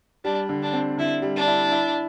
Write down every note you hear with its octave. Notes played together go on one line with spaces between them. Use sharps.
G3 D4
D3
D4
C4
D3 E4
G3
D4
E4
E4